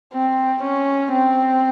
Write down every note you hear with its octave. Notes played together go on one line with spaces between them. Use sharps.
C4
C#4
C4